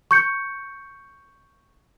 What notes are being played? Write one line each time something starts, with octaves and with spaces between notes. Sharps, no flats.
C#6 G6 C#7